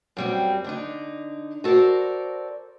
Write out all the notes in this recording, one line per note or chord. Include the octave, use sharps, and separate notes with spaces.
F#2 G3 C4
D3 D4 D#4
F#4 A4 A#4 C5 D5